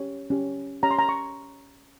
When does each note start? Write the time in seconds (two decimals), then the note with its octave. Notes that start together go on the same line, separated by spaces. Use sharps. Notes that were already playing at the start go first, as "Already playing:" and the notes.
Already playing: C#4 G4 C#5
0.30 C#4 G4 C#5
0.83 C#4 G4 C#5 A#5
0.91 C6
0.99 A#5
1.09 C#6